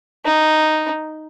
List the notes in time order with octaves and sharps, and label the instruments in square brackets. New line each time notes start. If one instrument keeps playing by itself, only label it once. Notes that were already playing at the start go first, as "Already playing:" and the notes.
[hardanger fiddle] D#4